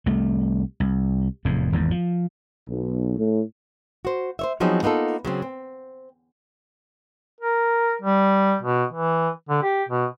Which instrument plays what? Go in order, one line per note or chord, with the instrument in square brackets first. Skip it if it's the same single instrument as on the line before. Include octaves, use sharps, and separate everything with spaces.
[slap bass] C2 A3
C2
F1 E2 A2
G#1 E2 G#2
F3
[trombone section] B1
A2
[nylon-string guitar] F#4 C5
C5 C#5 E5
F3 F#3 B3 C4 D#4 G#4
A#3 B3 D#4 F4 A4
C#3 F#3 C4
C4
[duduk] A#4
G3
B2
E3
D3
G4
B2